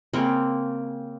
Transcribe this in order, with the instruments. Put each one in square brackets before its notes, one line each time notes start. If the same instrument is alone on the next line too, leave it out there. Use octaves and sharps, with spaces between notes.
[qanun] C#3 A#3 C4